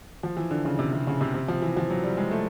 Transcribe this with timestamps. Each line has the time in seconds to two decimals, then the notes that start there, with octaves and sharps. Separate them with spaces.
0.23 F3
0.37 E3
0.51 D3
0.65 C#3
0.79 C3
0.93 C3
1.07 C#3
1.21 C3
1.34 C3
1.48 F3
1.62 E3
1.77 F3
1.91 F#3
2.03 G3
2.17 G#3
2.31 A3